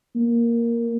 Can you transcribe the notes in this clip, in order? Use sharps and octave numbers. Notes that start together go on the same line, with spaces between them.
A#3